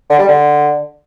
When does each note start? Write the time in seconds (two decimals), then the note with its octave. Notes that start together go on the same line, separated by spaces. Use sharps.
0.10 D3
0.19 G3
0.28 D3